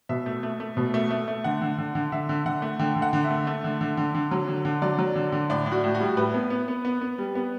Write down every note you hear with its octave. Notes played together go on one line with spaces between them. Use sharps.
B2 E5
A3
A3
A3
B2
A3
A3
A3
D3 F#5
D3
D3
D3
D3 E5
D3
D3 F#5
A3
D3 G5
D3
F#5
D3
E5
A3
A3
D3
D3
D3
D3
F#3
D3
D3
F#3 D5
F#3
D3
D3
A2 D5
A2
F#4
A2
F#4
G3
A2 B4
B3
B3
B3
B3
B3
G3
B3